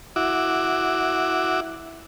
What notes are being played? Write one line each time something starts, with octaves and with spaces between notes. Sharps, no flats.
E4 F#4 D6